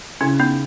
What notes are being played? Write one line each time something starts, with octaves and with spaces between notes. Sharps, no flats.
C#3 C#4 E4
B3 D#4